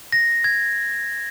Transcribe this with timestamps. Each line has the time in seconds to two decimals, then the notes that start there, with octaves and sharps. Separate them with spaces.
0.12 A#6
0.44 G#6